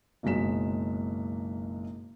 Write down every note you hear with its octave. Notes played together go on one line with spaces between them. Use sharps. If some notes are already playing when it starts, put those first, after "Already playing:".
F#1 B1 F#3 G#3 B6 E7